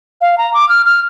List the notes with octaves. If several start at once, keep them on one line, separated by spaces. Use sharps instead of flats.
F5
A#5
D6
F6
F6